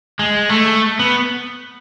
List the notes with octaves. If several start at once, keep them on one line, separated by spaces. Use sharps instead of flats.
G#3
A3
B3